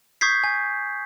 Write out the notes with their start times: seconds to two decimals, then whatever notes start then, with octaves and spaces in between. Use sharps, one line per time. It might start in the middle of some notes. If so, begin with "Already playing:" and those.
0.21 C#6 D#6 G6 G#6 B6 C7
0.44 G#5